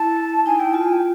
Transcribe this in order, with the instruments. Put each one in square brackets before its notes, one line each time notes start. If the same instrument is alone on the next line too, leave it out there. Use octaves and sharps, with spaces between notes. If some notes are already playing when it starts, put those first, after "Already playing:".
Already playing: [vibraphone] E4 [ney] A5
[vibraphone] D#4 [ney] G#5
[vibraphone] E4 [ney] G5
[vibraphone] F4 [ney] A5
[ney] G#5
G5